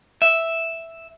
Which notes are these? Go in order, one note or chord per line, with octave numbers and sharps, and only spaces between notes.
E5